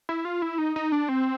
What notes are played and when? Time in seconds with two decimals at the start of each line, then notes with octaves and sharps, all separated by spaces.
0.09 E4
0.25 F4
0.42 E4
0.58 D#4
0.76 D#4
0.92 D4
1.09 C4